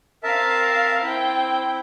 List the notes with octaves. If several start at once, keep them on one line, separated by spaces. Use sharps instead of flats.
C4 A#4 E5 F5 A5
C4 E4 G5